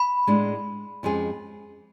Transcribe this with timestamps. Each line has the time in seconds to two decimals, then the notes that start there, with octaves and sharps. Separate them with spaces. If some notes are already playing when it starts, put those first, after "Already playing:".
Already playing: B5
0.27 A2 G#3 D4
1.03 F2 F3 G#3 C#4 G#4